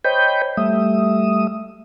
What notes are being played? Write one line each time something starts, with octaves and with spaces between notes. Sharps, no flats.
C5 C#5 D#5 G5 B5 G6
G3 A3 E5 D#6